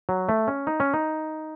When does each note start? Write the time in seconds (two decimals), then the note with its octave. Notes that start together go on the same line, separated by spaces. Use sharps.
0.09 F#3
0.29 A3
0.48 C#4
0.67 D#4
0.80 C#4
0.94 D#4